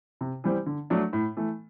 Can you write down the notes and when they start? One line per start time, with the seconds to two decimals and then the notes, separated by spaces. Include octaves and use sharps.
0.21 C3
0.44 E3 G3 C4
0.66 D3
0.90 F#3 A3 D4
1.13 A2
1.37 E3 A3